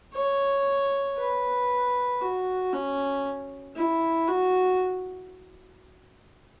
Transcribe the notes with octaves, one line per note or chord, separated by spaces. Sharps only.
C#5
B4
F#4
C#4
E4
F#4